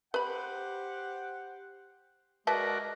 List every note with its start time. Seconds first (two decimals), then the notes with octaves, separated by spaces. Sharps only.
0.14 G4 B4 C5 F#5 B5
2.47 G#3 F#4 A#4 B4 D5 E5 A5